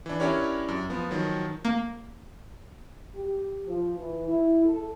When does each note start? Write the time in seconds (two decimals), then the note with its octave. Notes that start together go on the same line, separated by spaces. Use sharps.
0.06 E3 D4
0.20 C#4 D4 E4 G4 A#4 C#5
0.68 F#2
0.90 F3 B3
1.11 D#3 F3 F#3
1.65 A#3
3.15 G4
3.66 F3
3.98 E3
4.28 E4
4.64 A4